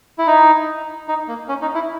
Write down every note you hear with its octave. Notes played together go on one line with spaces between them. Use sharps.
E4
D#4
D#4
A#3
C#4
D#4
E4